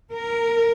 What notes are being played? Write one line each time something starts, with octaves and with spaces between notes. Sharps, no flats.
A#4